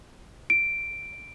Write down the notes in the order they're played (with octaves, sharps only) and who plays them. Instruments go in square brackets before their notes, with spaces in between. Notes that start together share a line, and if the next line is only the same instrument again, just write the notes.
[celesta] D7